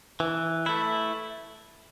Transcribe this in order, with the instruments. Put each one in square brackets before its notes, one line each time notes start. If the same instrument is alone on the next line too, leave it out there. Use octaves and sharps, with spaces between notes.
[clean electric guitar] E3
A3 E4